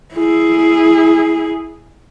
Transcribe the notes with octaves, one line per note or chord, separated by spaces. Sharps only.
E4 G#4